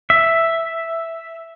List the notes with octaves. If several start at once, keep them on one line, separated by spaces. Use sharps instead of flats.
E5